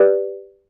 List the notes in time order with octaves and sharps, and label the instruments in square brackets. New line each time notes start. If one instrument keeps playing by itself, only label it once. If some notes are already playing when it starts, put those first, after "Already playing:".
Already playing: [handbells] G4 B4 D5